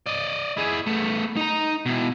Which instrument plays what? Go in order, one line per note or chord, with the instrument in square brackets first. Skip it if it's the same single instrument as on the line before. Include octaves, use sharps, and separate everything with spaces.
[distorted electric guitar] D5 D#5
E4 G#4
A3 B3
D#4 A#5
B2 E4